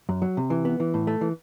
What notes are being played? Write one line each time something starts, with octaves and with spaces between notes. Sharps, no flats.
F#2
F#3
C3
E3
B3
E3
A2
A3
E3